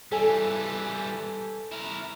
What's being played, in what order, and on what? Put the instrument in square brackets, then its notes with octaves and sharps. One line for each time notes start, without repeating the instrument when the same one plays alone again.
[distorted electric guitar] E3 G3 [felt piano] A4 G#5
[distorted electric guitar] E4 A#4